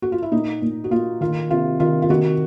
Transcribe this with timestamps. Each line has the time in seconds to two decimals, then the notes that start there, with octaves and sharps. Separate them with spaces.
0.02 F#4
0.12 F4
0.22 E4
0.32 A#2 D#4
0.62 A#2
0.84 F#4
0.91 A#2 F4
1.21 D#3 F4
1.50 C3 F4
1.80 D#3 F4
2.02 F4
2.10 D#3 F#4